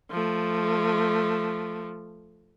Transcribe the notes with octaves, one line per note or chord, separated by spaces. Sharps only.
F3 A3